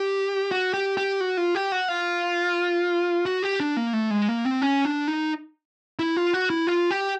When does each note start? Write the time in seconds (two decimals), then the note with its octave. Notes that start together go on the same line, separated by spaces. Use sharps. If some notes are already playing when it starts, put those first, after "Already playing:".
Already playing: G4
0.51 F#4
0.74 G4
0.97 G4
1.21 F#4
1.37 F4
1.55 G4
1.72 F#4
1.88 F4
3.26 F#4
3.43 G4
3.60 D4
3.77 A#3
3.93 A3
4.10 G#3
4.28 A#3
4.45 C4
4.62 C#4
4.85 D4
5.08 D#4
5.99 E4
6.17 F4
6.33 F#4
6.50 E4
6.67 F4
6.91 G4